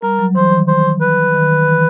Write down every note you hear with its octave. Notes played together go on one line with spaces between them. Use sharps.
G3 A#4
F#3
E3 C5
D#3
C5
B4
D#3
E3